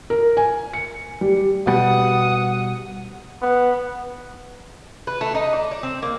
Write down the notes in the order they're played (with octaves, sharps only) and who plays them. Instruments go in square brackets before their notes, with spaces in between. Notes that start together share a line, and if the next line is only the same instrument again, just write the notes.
[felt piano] A#4
G#5
C#7
G3
[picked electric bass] B2 G3 [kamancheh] F#5 D#6
[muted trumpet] B3
[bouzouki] B4
A3
D#4
D5
D5
C4
A#3